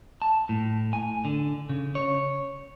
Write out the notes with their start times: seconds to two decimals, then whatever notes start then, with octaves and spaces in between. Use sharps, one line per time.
0.22 A5
0.49 A2
0.93 G#5
1.25 D3
1.69 C#3
1.95 C#5